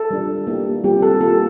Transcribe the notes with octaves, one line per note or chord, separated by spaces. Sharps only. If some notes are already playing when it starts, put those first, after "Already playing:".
Already playing: A4
G3 D4 F4
A#3 E4 G4
G3 C4 F4 G4
A4
A#3 F4 A4